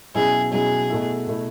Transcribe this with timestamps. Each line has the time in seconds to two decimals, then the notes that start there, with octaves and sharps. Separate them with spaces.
0.15 B2 F#3 C#4 E4 G#4
0.51 B2 F#3 C#4 E4 G#4
0.90 B2 A3 E4
1.27 B2 A3 E4